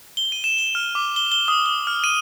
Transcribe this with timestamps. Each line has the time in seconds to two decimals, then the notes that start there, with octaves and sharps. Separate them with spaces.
0.17 G7
0.32 D#7
0.44 E7
0.59 G7
0.75 F6
0.95 D6
1.16 G7
1.32 G7
1.48 D#6
1.66 G7
1.87 F6
2.04 D#7